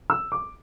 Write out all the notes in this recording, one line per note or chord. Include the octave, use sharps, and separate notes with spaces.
E6
D6